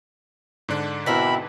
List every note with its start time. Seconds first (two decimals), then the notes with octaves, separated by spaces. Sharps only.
0.69 G#2 D3 D4
1.06 B2 C4 E4 A#4 B5